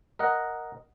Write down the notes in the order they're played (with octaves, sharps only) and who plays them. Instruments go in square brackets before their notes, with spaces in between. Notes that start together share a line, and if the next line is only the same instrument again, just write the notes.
[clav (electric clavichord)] A#4 D#5 F#5